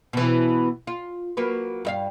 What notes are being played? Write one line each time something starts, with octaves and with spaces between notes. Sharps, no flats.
B2 E3
F4
F#3 A#3 B4
G2 E5 F5